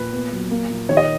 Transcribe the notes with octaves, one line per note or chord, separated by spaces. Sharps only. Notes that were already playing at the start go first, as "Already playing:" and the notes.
Already playing: A#2 B4
B3
F#3
A#3
A#2
D#3 C#5
D#5